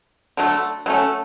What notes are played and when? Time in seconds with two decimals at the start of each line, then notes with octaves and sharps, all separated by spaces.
0.37 D3 F#3 A3
0.86 F#3 A3 C#4